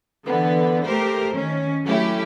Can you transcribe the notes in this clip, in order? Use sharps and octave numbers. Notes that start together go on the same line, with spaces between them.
D3 E3 B3
A3 G4 A#4 C5
D#3 C#4
F#3 A3 C#4 E4 G4